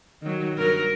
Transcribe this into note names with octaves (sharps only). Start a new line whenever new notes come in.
D#3 F#3
G2 F#3 A#4